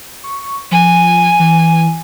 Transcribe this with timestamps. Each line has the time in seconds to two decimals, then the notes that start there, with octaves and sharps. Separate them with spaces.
0.24 C#6
0.72 F3 G#5
1.39 E3